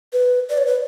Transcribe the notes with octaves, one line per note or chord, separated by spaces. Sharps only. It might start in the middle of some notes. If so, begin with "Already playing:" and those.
B4
D5
C#5
B4